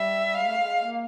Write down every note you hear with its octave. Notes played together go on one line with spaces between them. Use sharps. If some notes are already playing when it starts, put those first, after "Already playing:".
Already playing: G3 E5
G#3 F5
A3
G#3
A#3